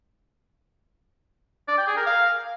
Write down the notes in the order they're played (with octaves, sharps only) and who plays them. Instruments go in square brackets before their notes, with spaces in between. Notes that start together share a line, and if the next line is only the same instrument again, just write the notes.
[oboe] D5
G5
G#4
A#4
F5